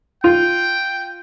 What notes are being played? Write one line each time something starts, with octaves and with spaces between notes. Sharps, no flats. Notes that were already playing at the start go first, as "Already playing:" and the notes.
F4 G5